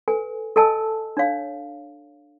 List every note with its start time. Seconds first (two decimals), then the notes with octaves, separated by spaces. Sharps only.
0.08 A4 B4 G#5
0.56 A4 D#5 G#5 A5 E6
1.17 D4 C#5 F5